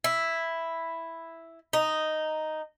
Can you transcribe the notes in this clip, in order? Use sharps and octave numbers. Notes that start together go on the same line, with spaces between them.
E4
D#4